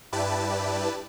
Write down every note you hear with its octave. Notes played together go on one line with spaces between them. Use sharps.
G2 E4 G4 B4 D5 A5